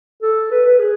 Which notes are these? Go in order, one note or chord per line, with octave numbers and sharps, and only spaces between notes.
A4
B4
B4
G#4